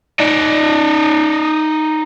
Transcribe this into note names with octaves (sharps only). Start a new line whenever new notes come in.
D#4 D5